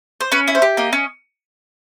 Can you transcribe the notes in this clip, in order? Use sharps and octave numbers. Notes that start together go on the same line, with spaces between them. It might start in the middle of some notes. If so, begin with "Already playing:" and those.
C5
C#4 B4
E4
C5
G4
A#3 D#5
C#4